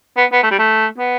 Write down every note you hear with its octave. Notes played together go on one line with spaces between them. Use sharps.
B3
B3
A3
G3
A3
B3